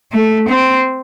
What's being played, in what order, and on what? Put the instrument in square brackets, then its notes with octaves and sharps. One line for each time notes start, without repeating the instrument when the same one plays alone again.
[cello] A3
C4